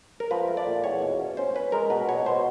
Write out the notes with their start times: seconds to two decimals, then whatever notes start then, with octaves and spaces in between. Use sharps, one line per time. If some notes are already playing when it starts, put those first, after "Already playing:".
0.20 A#4
0.31 F3 B4
0.48 A3
0.57 D5
0.67 A#2
0.84 E2 C#5
1.02 B2
1.19 C#4
1.37 C#4 C5
1.55 C#4 B4
1.72 G#3 A#4
1.90 B2 B4
2.09 B2 C#5
2.26 B2 C5